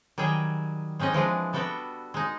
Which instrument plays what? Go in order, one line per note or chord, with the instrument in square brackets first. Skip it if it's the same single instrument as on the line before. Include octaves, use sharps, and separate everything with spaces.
[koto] D#3 F#3 G3 G#4 G5
G#3 C4 C#4 D#4 D#5
E3 F3 G#3 D4
G3 B3 F#4 A4 G5
G#3 D#4